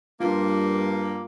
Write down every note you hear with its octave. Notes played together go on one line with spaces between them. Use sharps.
G2 A#3 F4